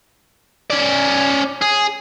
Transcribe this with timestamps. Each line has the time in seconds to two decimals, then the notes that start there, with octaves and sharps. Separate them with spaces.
0.70 C#4 D5
1.62 G#4